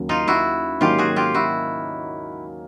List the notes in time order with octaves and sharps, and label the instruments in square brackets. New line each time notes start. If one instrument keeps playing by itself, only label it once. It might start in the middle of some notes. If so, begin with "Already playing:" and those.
Already playing: [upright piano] D#2 C#3 F#3 A#3
[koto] D#4 F4
E4 F#4
[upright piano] G#2 D#3 F#3 A#3 C#4 [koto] F4 G4
[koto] F#4 G#4
F4 G4
E4 F#4